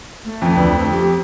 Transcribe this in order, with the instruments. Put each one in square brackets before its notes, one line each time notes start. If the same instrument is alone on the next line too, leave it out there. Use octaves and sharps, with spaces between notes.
[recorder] A3
[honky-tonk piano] F2
[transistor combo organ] D2 D4 B4
[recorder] A3 [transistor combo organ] C4
[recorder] G4